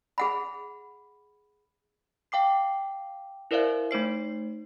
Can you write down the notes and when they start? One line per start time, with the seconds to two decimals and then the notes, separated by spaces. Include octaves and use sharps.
0.18 G#4 F#5 B5
2.32 F5 G5 D6 C7
3.51 E4 A#4 C5 D5 E5 F5
3.91 A3 D#4 C5 C7